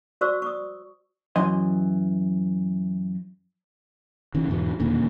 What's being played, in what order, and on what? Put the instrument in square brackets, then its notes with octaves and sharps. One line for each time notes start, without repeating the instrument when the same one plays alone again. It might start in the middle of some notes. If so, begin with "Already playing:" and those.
[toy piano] F#4 C5 D5 C#6 E6
C#6 D#6
[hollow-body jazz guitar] F#2 E3 D#5 C6
[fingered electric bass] D#3 E3 C#4
E2 G#2 B2 E3
E1 D#2 A#2 D3